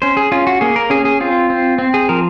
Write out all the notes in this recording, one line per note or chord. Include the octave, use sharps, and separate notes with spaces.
C#4 C5
G#4
C#4 F4
F#4
A#3 G#4
A#4
C#4 G#4
G#4
C4 F4
C4
C4
G#4
F3 A#4